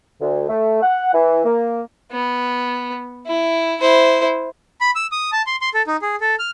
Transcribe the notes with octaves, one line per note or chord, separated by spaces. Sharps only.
D2
A3
F#5
E3
A#3
B3
E4
E4 C5
B5
E6
D#6
A5
C6
C6
A4
D#4
G#4
A4
F6